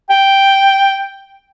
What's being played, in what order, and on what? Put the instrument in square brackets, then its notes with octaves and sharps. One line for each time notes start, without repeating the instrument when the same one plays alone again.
[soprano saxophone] G5